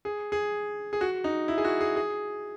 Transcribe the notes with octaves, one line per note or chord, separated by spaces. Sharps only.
G#4
G#4
G#4
F#4
D#4
E4
G#4
F#4
G#4
G#4